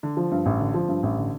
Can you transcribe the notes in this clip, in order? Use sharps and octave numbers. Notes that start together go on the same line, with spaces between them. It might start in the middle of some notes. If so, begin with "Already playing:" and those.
D3
F3
G2
A1
D3
F3
G2
A1
D3